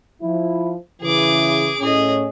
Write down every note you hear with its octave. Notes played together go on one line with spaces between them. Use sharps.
F3 E4
C#3 E3 G#4 D6
A2 C#4 G#4 D#5